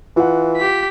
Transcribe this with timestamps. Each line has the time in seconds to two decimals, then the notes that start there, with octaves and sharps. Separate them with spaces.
0.16 E3 F4 F#5
0.57 G4 B6